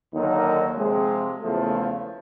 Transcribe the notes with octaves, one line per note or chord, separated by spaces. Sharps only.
D#2 D3 F#3 A#3 D#4
C3 F3 G#3
E2 C#3 F3 A3